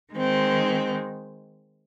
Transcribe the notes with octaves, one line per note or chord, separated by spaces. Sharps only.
D#3 G#3 C4